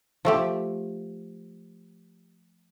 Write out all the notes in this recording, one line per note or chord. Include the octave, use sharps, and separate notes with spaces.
F3 A3 G4